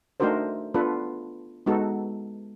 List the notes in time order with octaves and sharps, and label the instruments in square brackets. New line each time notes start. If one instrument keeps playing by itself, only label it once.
[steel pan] A3 D4 D#4 F#4 A#4 C5
B3 D4 F4 A4 B4
G#3 B3 D#4 F#4 A4